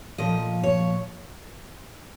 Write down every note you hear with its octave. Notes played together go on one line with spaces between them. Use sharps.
A#2 F3 D#5
C#5